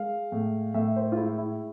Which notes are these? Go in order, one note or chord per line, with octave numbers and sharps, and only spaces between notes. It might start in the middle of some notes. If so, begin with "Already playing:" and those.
Already playing: G#3 F5
A2
A2 E5
C5
F4
G#3 E4
E4